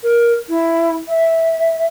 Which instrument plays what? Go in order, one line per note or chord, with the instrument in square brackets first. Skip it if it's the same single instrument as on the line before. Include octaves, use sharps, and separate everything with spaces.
[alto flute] A#4
E4
E5